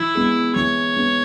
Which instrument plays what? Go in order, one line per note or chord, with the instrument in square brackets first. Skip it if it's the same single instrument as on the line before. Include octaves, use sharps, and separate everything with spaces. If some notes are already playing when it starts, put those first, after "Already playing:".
Already playing: [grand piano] E3 [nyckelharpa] E4
[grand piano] G#3 B3
[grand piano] E3 [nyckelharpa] C#5
[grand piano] G#3 B3